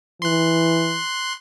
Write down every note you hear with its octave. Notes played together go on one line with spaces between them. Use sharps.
E3 C6 F#6